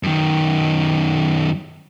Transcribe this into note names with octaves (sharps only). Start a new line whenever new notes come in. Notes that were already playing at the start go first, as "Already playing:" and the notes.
F#2 D#3